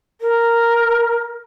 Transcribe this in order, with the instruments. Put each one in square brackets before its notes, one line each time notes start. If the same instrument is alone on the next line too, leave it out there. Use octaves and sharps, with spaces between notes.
[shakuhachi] A#4